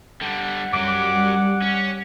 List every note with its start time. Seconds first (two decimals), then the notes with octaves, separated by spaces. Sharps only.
0.22 D3 G3 F#5
0.73 F#2 F#3 G3 D6
1.62 C#4